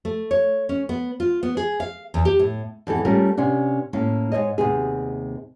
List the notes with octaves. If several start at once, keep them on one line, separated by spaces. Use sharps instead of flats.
A3
C#5
C#4
B3
F4
B3
G#4
F5
E2
G4
A2
F2 E3 B3 A4
G3 A3 C#4 F4 A#4
C3 B3 C#4 D4
A2 A#3 C#4
G#2 C#3 C#5 D#5
D#2 C3 B3 G#4